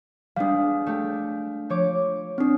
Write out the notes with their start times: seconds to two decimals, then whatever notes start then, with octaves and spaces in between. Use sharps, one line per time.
0.36 G3 G#3 B3 D4 F5
0.86 A3 G4
1.70 F3 C#5 D6
2.38 C4 D4